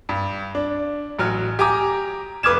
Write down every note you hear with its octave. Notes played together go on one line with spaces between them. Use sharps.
G2
D4
A1 F#3 F6
G4 G#5 A#5 D6
F1 B4 D6 F6 G#6 E7